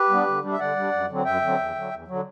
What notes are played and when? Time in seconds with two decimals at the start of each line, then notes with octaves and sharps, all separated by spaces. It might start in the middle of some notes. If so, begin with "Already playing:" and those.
Already playing: G4 B4
0.09 G3 B3 D4
0.27 D3
0.42 G3 D4
0.52 E5
0.59 D3 D5 F#5
0.76 G3 D4
0.92 F#2
1.09 D3 F#3 C4
1.25 F#2 E5 G5
1.42 D3 F#3 C4
1.58 E2
1.75 D3 F#3
1.91 E2
2.08 D3 F#3